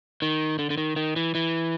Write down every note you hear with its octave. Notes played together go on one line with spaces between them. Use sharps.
D#3
D3
D3
D#3
D#3
E3
E3